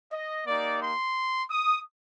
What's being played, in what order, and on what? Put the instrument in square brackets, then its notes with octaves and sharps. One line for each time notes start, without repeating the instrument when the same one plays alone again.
[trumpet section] D#5
A#3 D#4 G4 D5
C6
D#6